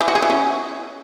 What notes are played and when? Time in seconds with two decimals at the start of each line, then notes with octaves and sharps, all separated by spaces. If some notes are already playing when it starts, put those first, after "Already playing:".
0.01 E3
0.08 F#4
0.15 G#4
0.22 E3
0.30 C#4